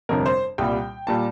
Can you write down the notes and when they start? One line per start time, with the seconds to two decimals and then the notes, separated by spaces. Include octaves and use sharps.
0.09 G1 F2 C3 A#4
0.26 C5
0.58 C2 A#2 G3 G5
1.07 A#2 G3 A5